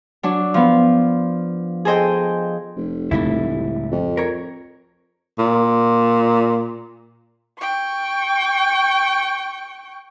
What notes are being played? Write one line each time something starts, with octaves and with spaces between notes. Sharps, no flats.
F#3 D4 F#4
F3 B3
G#4 A4 C5 D#5 G5
F1
C#2 A2 G3 E4
F2
A#4 C#5
A#2
G5 C#6